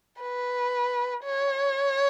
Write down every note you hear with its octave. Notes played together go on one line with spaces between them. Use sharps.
B4
C#5